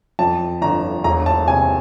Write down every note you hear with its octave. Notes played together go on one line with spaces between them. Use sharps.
F2 A5
G1 A#5
E1 A#5
A5
C3 G#5